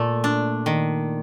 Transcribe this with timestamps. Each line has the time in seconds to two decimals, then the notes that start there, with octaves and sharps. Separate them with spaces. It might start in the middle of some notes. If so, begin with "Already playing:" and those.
Already playing: A#2 A3
0.24 D4
0.66 D#3